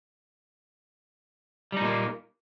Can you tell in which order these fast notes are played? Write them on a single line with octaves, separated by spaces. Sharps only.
G3 D#4 A#2 A#3